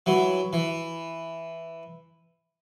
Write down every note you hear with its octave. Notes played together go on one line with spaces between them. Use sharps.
E3 F#3
E3